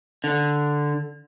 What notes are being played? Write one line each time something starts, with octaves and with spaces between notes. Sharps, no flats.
D3